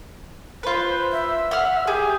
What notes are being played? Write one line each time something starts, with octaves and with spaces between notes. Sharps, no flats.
F4 B4 C5
E5
F#5 F6
G4 G#4